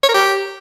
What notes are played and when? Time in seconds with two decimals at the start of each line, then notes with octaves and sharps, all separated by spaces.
0.04 C#5
0.09 A#4
0.15 G4